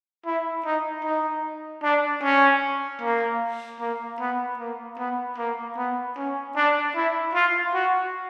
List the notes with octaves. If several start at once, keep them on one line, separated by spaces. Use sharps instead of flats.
E4
D#4
D#4
D4
C#4
A#3
A#3
B3
A#3
B3
A#3
B3
C#4
D4
E4
F4
F#4